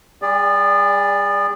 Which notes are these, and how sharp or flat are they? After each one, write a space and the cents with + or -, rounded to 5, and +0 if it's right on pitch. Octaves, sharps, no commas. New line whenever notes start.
G3 +10 G#4 -30 D5 +0